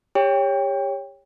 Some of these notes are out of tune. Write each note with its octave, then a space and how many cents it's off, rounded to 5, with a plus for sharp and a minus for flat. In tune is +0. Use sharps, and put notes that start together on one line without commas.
G4 +30 C#5 +0 G5 +20